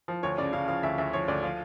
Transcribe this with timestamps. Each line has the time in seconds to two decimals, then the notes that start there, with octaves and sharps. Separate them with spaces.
0.08 F3
0.23 D2 C#5
0.38 C#3 D5
0.53 C#3 F5
0.68 F3 F5
0.83 D2 E5
0.98 D2 E5
1.13 F3 C#5
1.28 D2 D5
1.43 F3 F5